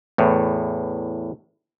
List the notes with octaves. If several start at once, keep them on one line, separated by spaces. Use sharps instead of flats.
E2 A2